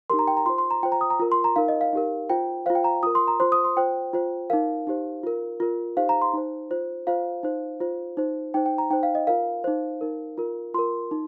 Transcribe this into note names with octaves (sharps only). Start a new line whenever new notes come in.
D#4 G4 A#4 C6
A#5
G5
A#5
F4 C5 C6
C6
A#5
F4 C5 G5
A#5
D#6
A#5
F4 A#4
C6
A#5
D#4 A#4 F5
D#5
F5
D#4 G4 A#4
F4 C5 G5
F4 C5 F5
G5
A#5
F4 A#4 D#6
C6
A#5
F4 C5 C6
D#6
C6
F4 C5 G5
F4 C5
D#4 A#4 F5
D#4 G4 C5
F4 A#4
F4 A#4
D#4 G4 C5 F5
A#5
C6
D#4 C5
F4 C5
F4 C5 F5
D#4 C5
F4 C5
D#4 C5
D#4 C5 G5
G5
A#5
D#4 C5 G5
F5
D#5
F4 A#4 F5
D#4 C5
D#4 A#4
F4 A#4
F4 A#4 C6
D#4